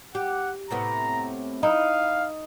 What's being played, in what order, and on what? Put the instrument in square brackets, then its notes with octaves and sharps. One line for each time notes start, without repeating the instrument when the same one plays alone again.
[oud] G4 [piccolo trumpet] F#5
[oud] A2 C3 B3 [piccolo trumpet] A#5
[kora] D#4 [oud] E4 [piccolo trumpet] F5